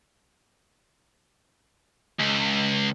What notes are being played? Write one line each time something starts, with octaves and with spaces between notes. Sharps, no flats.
C#2